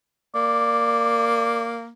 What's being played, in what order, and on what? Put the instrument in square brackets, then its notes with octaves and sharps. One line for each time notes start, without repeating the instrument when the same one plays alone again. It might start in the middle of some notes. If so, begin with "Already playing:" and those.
[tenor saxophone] A#3 [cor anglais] D5